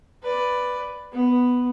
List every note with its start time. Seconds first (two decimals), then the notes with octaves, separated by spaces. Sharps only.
0.22 B4 D5
1.12 B3